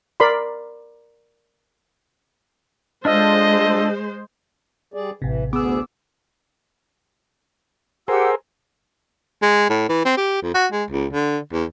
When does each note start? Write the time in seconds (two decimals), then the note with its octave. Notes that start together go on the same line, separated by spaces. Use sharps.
0.20 A#4 D5 B5 C6
3.05 G#3 D4 F4 A4 C5 D#5
4.94 G3 G#4 D5
5.22 A1 C3 E3
5.53 D2 B3 G#4 D6 E6
8.08 G4 G#4 A#4 C5 F#5 E6
9.42 G#3
9.70 A2
9.89 E3
10.05 C4
10.17 G4
10.42 F2
10.54 F#4
10.72 G#3
10.90 C#2
11.13 D3
11.53 E2